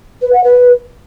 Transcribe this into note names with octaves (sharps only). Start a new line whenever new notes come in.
B4
F#5
B4